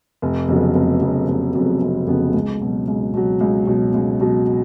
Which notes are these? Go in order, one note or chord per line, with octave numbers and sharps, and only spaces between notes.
F1
F2 C#3 F#3 B3
F1
F2 C#3 F#3 B3
F1
F2 C#3 F#3 B3
F1
F2 C#3 F#3 B3
C#2
B2 F#3
C#2
B2 F#3
C#2
B2 F#3
C#2
B2 F#3